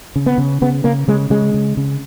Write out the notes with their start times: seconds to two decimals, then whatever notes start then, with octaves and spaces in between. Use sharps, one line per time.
0.16 C#3
0.26 B3
0.38 C#3
0.62 C#3 B3
0.84 C#3 A#3
1.08 C#3 G#3
1.30 C#3 G#3
1.54 C#3
1.77 C#3